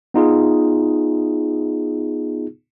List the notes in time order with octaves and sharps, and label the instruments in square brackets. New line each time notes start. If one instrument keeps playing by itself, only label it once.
[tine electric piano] B3 D#4 F4 G#4